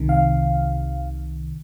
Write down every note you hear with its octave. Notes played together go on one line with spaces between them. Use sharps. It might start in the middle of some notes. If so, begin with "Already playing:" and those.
Already playing: C2 C3 D#3
F5